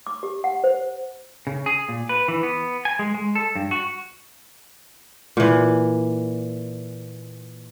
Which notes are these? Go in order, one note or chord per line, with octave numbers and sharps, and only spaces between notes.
D6
G4
F#5
C5
C#3
G#4
A#2
B4
E3
B3
G#5
G#3
G#3
A4
G2
F#4
A#2 E3